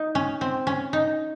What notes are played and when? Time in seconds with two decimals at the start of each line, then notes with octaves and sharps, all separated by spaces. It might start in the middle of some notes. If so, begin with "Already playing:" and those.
Already playing: D#4
0.15 C#4
0.41 C4
0.67 C#4
0.93 D#4